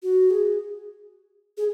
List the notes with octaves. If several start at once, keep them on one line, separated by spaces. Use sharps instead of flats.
F#4
G#4
G#4